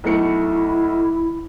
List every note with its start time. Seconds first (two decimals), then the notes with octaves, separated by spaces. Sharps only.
0.04 B1 A3 E4 C#7